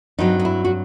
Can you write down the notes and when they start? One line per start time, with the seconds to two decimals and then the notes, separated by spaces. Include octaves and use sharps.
0.19 G2 F#3 C4 D#4
0.39 D#4
0.45 E4
0.65 F#4